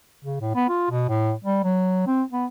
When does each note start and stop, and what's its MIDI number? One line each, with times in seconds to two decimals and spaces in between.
0.25 0.40 49
0.40 0.51 45
0.55 0.67 59
0.69 0.90 65
0.90 1.06 47
1.09 1.32 45
1.44 1.61 55
1.64 2.02 54
2.07 2.22 60
2.32 2.46 59